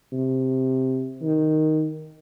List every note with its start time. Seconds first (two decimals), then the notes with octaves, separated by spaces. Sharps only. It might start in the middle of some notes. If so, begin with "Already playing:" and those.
0.13 C3
1.23 D#3